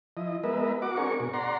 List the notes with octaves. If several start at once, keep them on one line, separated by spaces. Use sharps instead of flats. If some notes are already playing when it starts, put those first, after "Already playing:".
F3 E4 D#5
G#3 B3 A#4 B4 D#5 E5
F#4 F#5 D6
C4 D4 G#4 A#4 C#6
B2
D5 F#5 A#5 C6